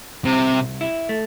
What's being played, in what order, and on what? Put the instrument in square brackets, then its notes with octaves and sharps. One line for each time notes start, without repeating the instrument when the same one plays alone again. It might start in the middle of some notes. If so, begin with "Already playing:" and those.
[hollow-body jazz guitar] C2 [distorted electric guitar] C3
[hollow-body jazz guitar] C2
E4
A3